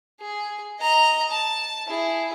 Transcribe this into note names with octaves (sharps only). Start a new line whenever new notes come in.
G#4
D#5 A#5
A5
E4 G#4